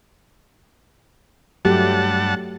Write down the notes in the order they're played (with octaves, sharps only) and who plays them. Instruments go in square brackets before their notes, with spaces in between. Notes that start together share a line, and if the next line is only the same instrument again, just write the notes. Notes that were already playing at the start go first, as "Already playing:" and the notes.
[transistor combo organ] G2 F#5 A5 [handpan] F#3 A3 G4